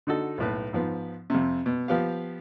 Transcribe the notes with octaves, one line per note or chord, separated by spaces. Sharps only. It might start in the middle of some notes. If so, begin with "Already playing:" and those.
D3 D#4 F#4 A4
B1 A2 B4
G#2 F3 B3
F2 C3
B2
F3 B3 G4 F5